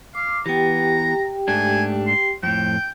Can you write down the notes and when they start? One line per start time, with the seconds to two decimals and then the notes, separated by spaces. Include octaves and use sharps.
0.15 F5 D6
0.46 E3 B3 G4 G5 A#5
1.48 G#2 A3 D4 G#5
2.07 C6
2.43 F2 A2 G5